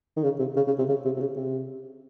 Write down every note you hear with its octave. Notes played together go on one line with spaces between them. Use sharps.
D#3
C#3
C3
C#3
C#3
C3
C#3
C3
C3
C#3
C3